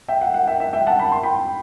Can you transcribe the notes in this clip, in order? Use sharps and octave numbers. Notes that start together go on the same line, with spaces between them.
E5 G5
F#5
F#5
E5 G5
E5
E5 G5
F#5 A5
B5
C6
G5 B5